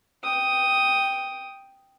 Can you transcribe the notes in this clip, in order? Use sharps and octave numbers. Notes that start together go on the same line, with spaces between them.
G5 D#6